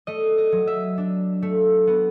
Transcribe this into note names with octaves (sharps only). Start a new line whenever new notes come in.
A3 D#5
D#5
F#3
E5
D4
A3
B3